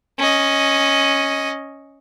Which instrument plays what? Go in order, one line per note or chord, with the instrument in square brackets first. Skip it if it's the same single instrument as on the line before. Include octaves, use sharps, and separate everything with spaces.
[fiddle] C#4 D#5